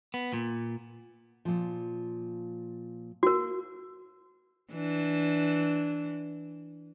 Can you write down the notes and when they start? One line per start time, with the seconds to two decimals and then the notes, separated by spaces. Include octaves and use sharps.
0.14 B3
0.33 A#2
1.45 A#2 F3
3.23 A#3 F#4 A#4
4.73 E3 D4